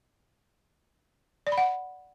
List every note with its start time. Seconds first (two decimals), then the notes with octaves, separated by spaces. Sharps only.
1.47 D5
1.52 B5
1.58 F#5